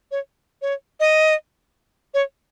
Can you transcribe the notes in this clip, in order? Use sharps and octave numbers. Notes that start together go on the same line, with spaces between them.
C#5
C#5
D#5
C#5